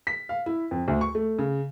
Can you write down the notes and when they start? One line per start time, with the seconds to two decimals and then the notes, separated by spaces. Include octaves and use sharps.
0.07 B6
0.29 F5
0.46 E4
0.71 F2
0.88 D2
1.01 C#6
1.15 A3
1.39 C#3